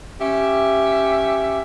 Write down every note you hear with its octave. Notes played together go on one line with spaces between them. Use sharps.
C#4 G4 E5